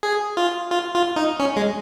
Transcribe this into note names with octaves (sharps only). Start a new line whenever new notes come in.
G#4
F4
F4
F4
D#4
C#4
G#3